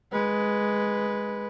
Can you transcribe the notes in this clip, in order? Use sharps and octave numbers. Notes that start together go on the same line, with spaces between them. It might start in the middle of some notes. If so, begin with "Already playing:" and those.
G#3 B4